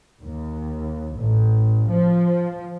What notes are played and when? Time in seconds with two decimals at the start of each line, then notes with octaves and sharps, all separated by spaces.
0.23 D#2
1.17 A1
1.89 F3